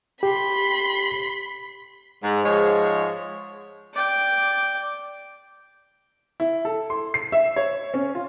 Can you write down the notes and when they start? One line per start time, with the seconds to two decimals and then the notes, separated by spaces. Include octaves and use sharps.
0.23 G4 B5 C6
2.22 G#2
2.44 G#2 F3 G#3 C#5
3.94 D5 G5
6.40 E4
6.65 A4
6.90 C6
7.14 C7
7.32 E5
7.56 C#5
7.94 C#4
8.15 F4